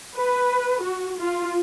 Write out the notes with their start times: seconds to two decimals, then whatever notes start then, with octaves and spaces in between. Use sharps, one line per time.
0.17 B4
0.82 F#4
1.20 F4